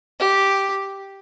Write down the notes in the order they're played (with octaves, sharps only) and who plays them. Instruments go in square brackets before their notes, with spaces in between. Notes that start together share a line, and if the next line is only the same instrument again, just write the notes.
[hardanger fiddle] G4